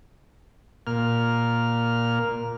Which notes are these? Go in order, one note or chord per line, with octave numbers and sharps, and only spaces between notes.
A#2 F6